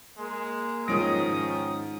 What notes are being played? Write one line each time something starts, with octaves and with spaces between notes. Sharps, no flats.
G#3 A#3
G#2 D#3 F3 C#4 D#6 A#6 D7